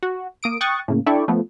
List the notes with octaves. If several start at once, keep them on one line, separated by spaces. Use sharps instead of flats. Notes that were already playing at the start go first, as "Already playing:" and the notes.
F#4
A#3 D#6 D7
G5 C#6 D#6 F#6 A6
A2 C#3 A#3
D4 E4 A4 D5 G5 C#6
F3 A3 B3